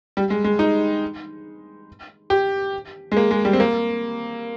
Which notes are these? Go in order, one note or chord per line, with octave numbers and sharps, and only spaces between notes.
G3
G#3
G#3
D#4
G4
G#3
A#3
G#3
G3
C4
A#3